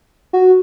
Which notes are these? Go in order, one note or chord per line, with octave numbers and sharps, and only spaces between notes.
F#4